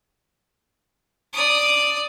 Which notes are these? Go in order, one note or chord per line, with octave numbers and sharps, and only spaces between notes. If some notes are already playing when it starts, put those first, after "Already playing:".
D5 D#6